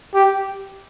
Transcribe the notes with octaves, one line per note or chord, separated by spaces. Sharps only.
G4